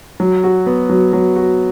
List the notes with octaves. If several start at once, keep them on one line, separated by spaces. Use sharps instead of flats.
F#3
F#4
B3
F#3
F#3
F#4